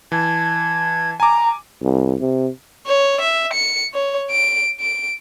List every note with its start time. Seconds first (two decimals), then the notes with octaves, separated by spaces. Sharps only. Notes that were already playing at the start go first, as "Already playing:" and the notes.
0.12 E3 A5 G#6
1.20 G#5 A#5 D6
1.82 C2
2.20 C3
2.86 C#5
3.20 E5
3.53 C#7
3.94 C#5
4.30 D7
4.80 D7